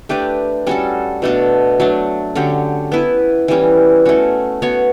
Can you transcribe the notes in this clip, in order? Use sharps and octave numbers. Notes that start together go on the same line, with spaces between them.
A3 D4 G4 B4
G3 C#4 F#4 A4
B2 A3 D4 F#4
F#3 A3 D4
D3 F#3 C#4 G4
B3 E4 B4
E3 G3 C#4 G4
A3 C#4 F#4
B3 F#4 C#5